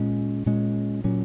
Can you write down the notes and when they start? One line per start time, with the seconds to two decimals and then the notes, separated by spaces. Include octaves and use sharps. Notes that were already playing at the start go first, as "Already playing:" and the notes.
Already playing: A#2 G#3 C#4
0.46 A#2 G#3 C#4
1.04 A#2 F#3 C#4